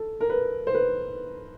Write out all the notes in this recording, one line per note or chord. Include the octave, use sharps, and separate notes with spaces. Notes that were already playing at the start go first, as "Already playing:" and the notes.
Already playing: A4
A#4
B4
C5
B4